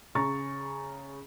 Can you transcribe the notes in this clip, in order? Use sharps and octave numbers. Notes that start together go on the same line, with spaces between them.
C#3 A#5 C#6 A6